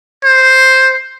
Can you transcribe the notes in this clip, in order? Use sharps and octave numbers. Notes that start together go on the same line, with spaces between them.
C5